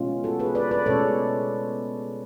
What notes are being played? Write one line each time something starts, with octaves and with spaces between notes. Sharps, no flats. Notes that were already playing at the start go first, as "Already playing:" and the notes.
Already playing: B2 G#3 B3 C#4 F4
F#4 A4
G#4 B4
B4 D5
B4 D5
B2 G#3 C#4 A4 C#5